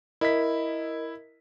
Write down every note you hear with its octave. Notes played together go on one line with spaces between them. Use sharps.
E4 A#4 D#5 B6